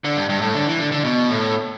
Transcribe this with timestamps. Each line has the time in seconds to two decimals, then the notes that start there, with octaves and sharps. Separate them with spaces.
0.04 D3
0.16 G2
0.29 G2
0.41 A2
0.54 D3
0.67 E3
0.79 D3
0.92 D3
1.04 B2
1.29 A2